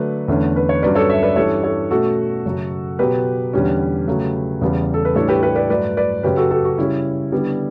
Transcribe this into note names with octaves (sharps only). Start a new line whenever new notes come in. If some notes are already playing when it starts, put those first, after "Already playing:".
Already playing: D3 F#3 A3 D4 B4
E2 D3 A3 C#4
B4
C#5
G2 F#3 C#4 B4 D5
A4 C#5
C#5 E5
B4 D5
G2 E3 G3 C#4 A4 C#5
A4 C#5
B2 A3 C#4 F#4 A4
F#2 C#3 F#3
B2 F#3 B3 G4 B4
E2 D3 G3 C#4
C#3 F#3 A3
E2 C#3 G3 B3
A4
B4
A2 E3 G3 D4 A4 C#5
G4 B4
G4 B4
B4 D5
G2 F#3 A3 D4 B4 D5
B4 D5
F#2 C#3 F#3 C#4 G4 B4
F#4 A4
F#4 A4
F#4
C#3 G3 C#4 E4
D3 G3 B3 D4